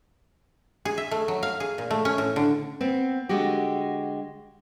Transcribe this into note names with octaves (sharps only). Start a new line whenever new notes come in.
G#4
E5
A3
F#3
F5
G#4
A#2
A3
C#4
A2
D3
B3 C4
D3 G#3 F#4 G4